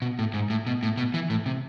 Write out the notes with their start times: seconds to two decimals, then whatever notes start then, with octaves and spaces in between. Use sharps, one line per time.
0.02 B2
0.19 A2
0.34 G#2
0.50 A2
0.67 B2
0.83 A2
0.97 B2
1.14 E3
1.30 A2
1.46 C3